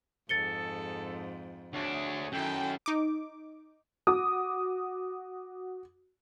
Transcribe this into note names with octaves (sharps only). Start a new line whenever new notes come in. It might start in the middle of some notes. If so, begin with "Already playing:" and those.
F2 G#2 G#4 A4 A6 C#7 G7
D2 D4 G#4 C#5
F#2 D#3 E4 A4 G5
D#4 D6
F#4 D6 D#6